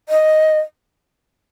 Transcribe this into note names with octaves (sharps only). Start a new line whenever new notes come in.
D#5